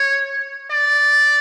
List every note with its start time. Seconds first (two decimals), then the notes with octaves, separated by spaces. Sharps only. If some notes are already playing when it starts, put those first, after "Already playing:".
Already playing: C#5
0.71 D5